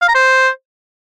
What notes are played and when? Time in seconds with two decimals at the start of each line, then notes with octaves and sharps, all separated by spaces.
0.01 F5
0.08 A#5
0.15 C5